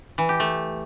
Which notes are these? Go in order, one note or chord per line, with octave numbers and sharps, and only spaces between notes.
E3
G4
A3